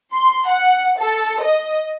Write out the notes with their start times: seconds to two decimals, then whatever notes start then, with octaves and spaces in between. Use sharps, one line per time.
0.14 C6
0.48 F#5
0.99 A4
1.43 D#5